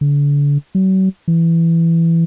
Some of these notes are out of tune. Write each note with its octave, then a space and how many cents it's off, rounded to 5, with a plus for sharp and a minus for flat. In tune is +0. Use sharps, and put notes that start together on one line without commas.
D3 -35
F#3 +40
E3 +10